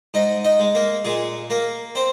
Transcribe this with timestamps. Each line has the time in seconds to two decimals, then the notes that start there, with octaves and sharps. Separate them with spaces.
0.14 G#2 D#4 D#5
0.45 D#4 D#5
0.60 G#3
0.75 A#3 A#4
1.05 A#2 G#3 G#4
1.50 A#3 A#4
1.95 C4 C5